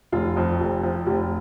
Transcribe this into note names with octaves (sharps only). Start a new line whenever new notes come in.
F1 F4
F2
F1
F3
F1 G4